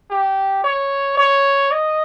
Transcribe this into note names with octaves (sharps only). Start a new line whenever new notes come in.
G4
C#5
C#5
D#5